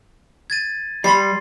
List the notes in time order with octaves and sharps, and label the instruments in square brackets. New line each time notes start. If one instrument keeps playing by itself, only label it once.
[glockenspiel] G#6 A6 D#7
[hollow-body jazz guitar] G3 B5 [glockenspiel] C6 A6 C7